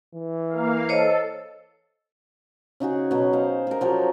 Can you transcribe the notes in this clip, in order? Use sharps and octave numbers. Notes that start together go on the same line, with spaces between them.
E3
A#3 F5
A4 C5 C#5 D#5
C#3 D#4 F#4 G#4
B2 F#3
C5 F5
G#4 A#4
F3 F#3 G4 C#5